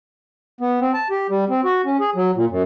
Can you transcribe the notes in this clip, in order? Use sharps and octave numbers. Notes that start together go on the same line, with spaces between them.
B3
C4
A5
G4
G3
C4
F#4
C#4
G#4
F#3
A#2
F#2